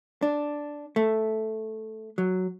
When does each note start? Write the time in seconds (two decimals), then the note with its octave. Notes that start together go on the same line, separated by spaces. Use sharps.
0.22 D4
0.96 A3
2.18 F#3